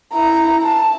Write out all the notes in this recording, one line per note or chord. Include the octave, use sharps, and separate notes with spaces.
E4 A#5
A5